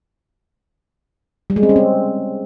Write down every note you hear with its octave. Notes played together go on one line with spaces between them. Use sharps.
G3
G#3
C4
C#4
C4